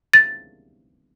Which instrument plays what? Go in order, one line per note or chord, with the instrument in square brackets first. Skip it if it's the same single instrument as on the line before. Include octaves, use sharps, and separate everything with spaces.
[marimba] A6